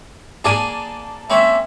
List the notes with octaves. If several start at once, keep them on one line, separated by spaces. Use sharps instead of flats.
A#3 G#4 D5 A5 D#7
A#3 C4 C#4 C#5 E5